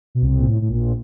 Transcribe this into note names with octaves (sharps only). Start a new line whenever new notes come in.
B2
C2 C3
A#2
A2
A2
A#1 A#2